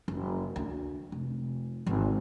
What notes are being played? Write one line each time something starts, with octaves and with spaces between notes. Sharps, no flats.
F#1
D2
F1
G#1 C4